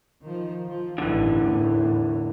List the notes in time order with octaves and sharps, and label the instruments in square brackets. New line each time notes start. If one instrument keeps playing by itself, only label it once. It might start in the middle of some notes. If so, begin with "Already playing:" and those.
[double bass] D#3 F3
F3
[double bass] A1 G2 [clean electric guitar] D3 E3
[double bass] E2 A2